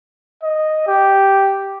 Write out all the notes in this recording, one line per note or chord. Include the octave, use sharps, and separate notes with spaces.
D#5
G4